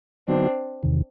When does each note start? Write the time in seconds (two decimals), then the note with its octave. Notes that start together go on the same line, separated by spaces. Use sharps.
0.28 D3 F#3 B3 C4 D4 D#4 F#4
0.83 E2 C3 D#3